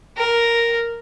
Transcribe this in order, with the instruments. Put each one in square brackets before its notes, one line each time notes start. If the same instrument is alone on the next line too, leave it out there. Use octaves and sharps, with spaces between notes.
[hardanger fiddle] A#4